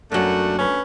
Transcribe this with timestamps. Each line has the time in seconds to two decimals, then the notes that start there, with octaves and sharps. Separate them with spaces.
0.12 F#2 A3 A#3 D4 F#4
0.58 D2 C#4 B4